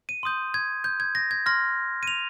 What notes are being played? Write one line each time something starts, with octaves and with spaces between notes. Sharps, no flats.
D#7
C6 D#6 G6
G#6
G6
G#6
A#6
G#6
C6 F6 A#6
D#7
F7